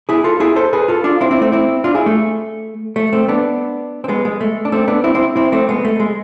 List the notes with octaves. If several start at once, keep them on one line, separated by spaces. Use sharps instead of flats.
E4 G#4
F4 A4
E4 G#4
A4 C5
G#4 B4
F4 A4
D4 F4
C4 E4
C4 E4
A3 C4
C4 E4
D4 F4
E4 G#4
A3
A3
A3 C4
B3 D4
C4
G#3 B3
G#3
A3
D4
A3 C4
B3 D4
C4 E4
C4 E4
C4 E4
A3 C4
G#3 B3
A3
G#3